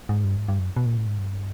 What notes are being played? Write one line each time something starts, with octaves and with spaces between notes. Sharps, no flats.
G#2
G2
G#2
G2
F#2
B2
A#2
A2
G#2
G2